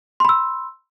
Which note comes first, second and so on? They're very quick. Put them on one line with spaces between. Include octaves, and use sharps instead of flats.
C6 B5 E6